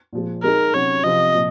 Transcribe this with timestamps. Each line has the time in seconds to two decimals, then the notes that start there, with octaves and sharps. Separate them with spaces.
0.13 A#2 F3 G#3
0.43 G#3 D#4 G#4 A#4
0.73 C3 F#3 C#4 F#4 C#5
1.03 C3 F3 C4 F4 D#5
1.35 A#2 F3